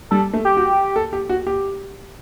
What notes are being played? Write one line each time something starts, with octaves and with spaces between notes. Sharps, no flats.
G3 A4
A3
G4
F#4
A4
G4
F#4
G4